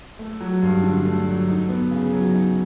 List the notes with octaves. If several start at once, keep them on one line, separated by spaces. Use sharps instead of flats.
A3
F#3
G2
D3
A3
F#3
D#4
B3
C#3
F#3
D#4